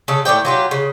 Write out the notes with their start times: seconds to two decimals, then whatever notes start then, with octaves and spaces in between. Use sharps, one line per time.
0.08 C#3 A4
0.25 A2 G#3 D5 G5
0.45 F#3 F4 G4
0.71 C#3